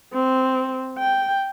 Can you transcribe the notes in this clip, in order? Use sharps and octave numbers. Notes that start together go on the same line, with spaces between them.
C4
G5